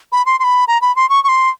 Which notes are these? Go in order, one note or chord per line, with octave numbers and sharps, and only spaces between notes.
B5
C6
C6
B5
A#5
B5
C6
C#6
C#6
C6